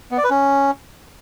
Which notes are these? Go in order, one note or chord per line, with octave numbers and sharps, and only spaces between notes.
B3
D5
B4
C#4